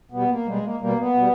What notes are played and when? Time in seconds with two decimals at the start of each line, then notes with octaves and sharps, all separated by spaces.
0.12 B2 G3 B3
0.29 A#3
0.46 B2 G3 G#3
0.64 A#3
0.80 B2 G3 A#3
0.98 B3
1.14 B2 G3